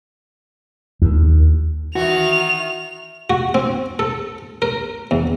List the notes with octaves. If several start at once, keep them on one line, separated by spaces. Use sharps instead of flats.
D#2
D#3 E3 F#4 F7
F#4
C4
A4
A#4
E2